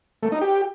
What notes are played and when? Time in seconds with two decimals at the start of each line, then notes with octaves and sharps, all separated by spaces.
0.23 A3
0.32 D#4
0.41 G4